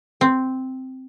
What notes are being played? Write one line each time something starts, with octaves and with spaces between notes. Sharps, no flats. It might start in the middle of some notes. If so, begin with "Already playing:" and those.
C4